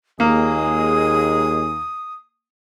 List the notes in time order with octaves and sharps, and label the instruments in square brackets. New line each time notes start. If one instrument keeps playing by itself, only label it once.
[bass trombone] D#2 [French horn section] A#2 G#3 G#4 [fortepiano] A#3 [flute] D#6